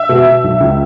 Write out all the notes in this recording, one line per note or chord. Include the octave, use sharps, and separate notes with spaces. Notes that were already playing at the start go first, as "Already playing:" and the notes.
Already playing: E5
B2
B2
B1
C#2